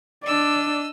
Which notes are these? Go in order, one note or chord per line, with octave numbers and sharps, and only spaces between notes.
D4 D5 D#5 E6